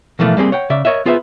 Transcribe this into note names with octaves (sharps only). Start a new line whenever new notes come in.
B2 E3 F3 A3 A#3
G3 A#3 C4 G#4
C#5 F#5 G5
C#3 D5 E5
A#4 C#5 D#5 E5
B3 F4 G#4 B4 C5 E5